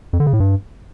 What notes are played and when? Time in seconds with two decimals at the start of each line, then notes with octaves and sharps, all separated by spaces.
0.13 F2
0.20 D3
0.27 C#3
0.33 A2
0.40 G2